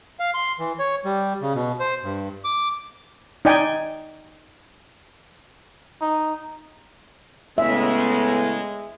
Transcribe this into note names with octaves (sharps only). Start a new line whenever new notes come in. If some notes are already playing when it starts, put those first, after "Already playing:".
F5
C6
E3
C#5
G3
C#3
B2
C5
G2
D6
D#4 D5 G5 G#5
D#4
A2 C#3 G#3 B3 E5